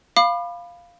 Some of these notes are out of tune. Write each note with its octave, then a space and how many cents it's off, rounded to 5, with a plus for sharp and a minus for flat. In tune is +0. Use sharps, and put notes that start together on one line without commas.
F5 +0 B5 +0 D6 +40